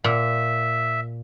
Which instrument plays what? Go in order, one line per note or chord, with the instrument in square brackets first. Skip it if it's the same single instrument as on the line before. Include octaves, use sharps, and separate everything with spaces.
[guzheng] A#2 [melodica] E5